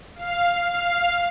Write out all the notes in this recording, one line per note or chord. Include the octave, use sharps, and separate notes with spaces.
F5
F5